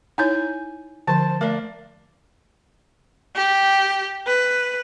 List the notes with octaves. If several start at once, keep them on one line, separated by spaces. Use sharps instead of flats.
D#4 E4 C#5 G#5 G6
D3 F3 C5 A5
A3 A#3 D4 A#4
G4
B4